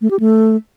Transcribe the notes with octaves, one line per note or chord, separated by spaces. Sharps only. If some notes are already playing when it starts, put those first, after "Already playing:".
A3
G4
A3